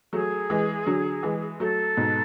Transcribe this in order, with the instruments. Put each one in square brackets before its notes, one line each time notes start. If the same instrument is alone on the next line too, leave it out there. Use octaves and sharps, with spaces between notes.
[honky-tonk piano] F#3 A3 [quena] G#4
[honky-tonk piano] E3 G#3
D3 F#3
E3 G#3
[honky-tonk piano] F#3 A3 [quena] A4
[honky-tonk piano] G#2 B2